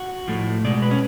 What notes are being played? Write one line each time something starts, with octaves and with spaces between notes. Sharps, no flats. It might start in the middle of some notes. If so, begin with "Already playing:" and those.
Already playing: F#4
A2 F3 A3
B2 G#3 D5
B4
C#4